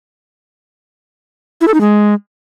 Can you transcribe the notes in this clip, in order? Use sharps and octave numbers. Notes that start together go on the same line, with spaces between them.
E4
A4
D#4
G#3